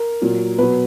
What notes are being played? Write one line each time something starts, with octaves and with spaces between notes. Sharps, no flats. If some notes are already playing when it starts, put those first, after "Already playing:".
Already playing: A#4
A#2 F#3
B2 F#3 B4